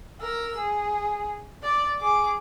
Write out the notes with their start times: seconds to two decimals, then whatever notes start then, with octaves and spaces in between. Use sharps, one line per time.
0.21 A#4 E6
0.58 G#4
1.63 D5
1.99 G#4 D6